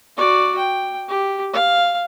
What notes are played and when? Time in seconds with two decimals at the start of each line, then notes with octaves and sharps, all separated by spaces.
0.17 F#4 D5
0.58 G5
1.08 G4
1.53 F5